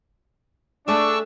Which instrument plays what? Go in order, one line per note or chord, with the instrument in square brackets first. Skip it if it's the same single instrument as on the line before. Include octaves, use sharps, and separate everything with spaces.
[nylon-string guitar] A3 G#4 D5 [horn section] D4 [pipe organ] A5 C#6 E6